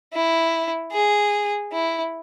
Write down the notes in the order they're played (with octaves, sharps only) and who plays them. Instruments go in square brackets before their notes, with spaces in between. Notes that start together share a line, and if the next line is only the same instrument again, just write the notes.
[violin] E4
G#4
E4